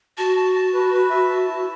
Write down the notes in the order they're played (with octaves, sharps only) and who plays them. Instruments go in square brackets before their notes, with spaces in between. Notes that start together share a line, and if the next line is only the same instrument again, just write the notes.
[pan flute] F#4 [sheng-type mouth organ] A5
[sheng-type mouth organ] A5
A5
B4
B4
E5
A5
E4